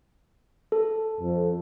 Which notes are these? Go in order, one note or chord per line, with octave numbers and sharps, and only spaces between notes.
A4
F2